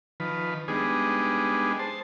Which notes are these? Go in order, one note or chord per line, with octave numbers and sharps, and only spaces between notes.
D#3 F3 B4
G3 G#3 B3 D4 D#4 G#4
C5 A5